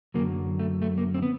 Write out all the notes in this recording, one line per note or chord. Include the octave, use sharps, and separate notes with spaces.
F#2 D3 F#3 A#3
A3
A3
A#3
C4
B3